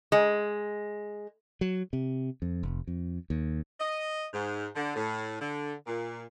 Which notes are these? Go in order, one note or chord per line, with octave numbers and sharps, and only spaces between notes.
G#3
F#3
C3
F2
F1
F2
D#2
D#5
G#2
D3
A2
D3
A#2